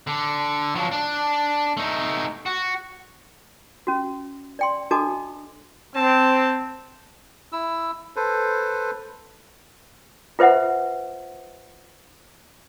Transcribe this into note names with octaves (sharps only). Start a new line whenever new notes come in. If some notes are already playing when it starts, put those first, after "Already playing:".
D3
F3 F#3
D4
A3 D#4
F#4
C#4 F#4
D5 G5 C6
D4 F#4 A4 D#5 A5 D6
C4 A5
E4 E6
A4 B4 C5
F4 B4 C5 E5 F#5